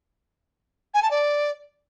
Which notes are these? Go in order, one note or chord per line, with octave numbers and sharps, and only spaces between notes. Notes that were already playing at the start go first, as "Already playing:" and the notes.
G#5
A5
D5